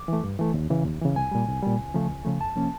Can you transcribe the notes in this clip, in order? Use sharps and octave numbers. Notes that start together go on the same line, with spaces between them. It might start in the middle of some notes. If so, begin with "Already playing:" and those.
Already playing: D6
E3 A3
G2
E3 A3
D#2
C#3 E3
D#2
C#3 E3
C2 G#5
A#2 G3
C2
A#2 G3
C#2
C#3 F3 A3
C#2
C#3 F3 A3
F2 A5
C3 F3 A#3 C#4